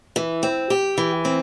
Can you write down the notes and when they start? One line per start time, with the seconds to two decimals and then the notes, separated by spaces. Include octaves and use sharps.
0.16 E3
0.43 C4
0.70 G4
0.98 E3
1.25 C4